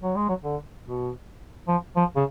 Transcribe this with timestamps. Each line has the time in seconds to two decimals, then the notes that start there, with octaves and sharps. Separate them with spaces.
0.02 F#3
0.16 G#3
0.29 F#3
0.44 D3
0.85 B2
1.68 F3
1.96 F3
2.16 C#3